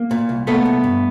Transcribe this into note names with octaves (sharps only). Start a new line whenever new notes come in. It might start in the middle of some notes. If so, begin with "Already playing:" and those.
Already playing: A#3
A#2
C2
A#2 A3 B3
C2
G2